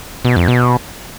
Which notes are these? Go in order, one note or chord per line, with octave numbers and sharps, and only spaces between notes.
B2
F2
B2